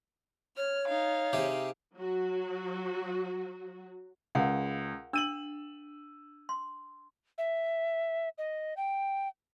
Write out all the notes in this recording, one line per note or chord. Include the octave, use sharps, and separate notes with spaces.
C#5 F6
D#4 F5
C3 G4 G#4
F#3 F#4
C#2 A#4 F5 F#5
D4 E6 D#7 F#7
C6
E5
D#5
G5